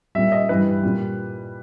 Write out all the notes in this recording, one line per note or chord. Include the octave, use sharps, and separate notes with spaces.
A#2 G3 E5
D#5
G2 E3 G3 B4
A#2 G3